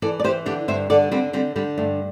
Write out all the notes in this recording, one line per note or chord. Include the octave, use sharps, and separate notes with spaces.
E3 A4 D5
D5
E3 G4 C5
D3 D4 G4
G2 C5 E5
D3 A4 D5
D3 G3 C4
D3 G3 C4
D3 G3
G2 A3